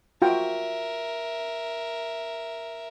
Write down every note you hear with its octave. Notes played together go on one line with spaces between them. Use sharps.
F4 F#4 A#4 E5 G5